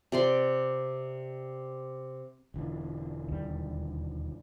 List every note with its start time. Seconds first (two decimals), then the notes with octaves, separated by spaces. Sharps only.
0.12 C3 D5 C6
2.54 E1 D3 E3
3.28 D#2 G3